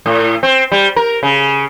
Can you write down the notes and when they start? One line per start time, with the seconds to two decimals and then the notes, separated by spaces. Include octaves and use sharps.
0.06 A2
0.43 C4
0.72 G3
0.96 A#4
1.23 C#3